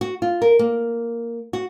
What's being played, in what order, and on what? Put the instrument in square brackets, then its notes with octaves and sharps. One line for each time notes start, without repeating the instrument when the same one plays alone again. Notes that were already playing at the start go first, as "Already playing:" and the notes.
[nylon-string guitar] F#4
F4
A#4
A#3
F#4